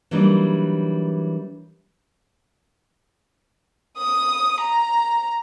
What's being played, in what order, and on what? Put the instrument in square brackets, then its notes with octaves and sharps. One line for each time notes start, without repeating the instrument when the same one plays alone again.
[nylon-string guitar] E3 F#3 G3 A#3 D4 D#4
[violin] D#6
A#5